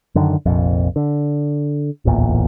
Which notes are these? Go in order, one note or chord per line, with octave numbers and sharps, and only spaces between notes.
F#2 D3 D#3
F1 A#1 F2
D3
D1 A1 E2 A#2